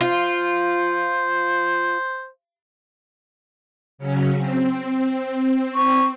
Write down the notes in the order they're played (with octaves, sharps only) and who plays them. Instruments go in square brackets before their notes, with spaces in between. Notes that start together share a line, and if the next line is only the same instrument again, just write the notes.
[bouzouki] F4 [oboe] C5
[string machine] C#3 F#3 C#4
C4
[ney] C#6